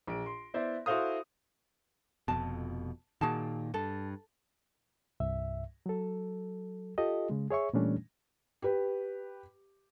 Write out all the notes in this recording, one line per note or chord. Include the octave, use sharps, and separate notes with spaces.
A#1 D7
C6
B3 E4 C5 D5 E5
E4 F#4 A4 C5 F5 D#6
F1 F2 B2 A5
A#2 D#3 F#4 G#4 A5
G2 A4
C2 G2 E5
F#3 A4
F4 G4 A4 D#5
C#3 G#3
G#4 C#5 E5 C#6
A#2 E3 G3 A3 C#4 D4
G4 B4